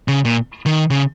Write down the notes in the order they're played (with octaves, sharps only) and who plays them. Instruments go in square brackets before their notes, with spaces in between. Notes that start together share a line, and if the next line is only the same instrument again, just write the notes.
[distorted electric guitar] C#3
A#2
D#3
C#3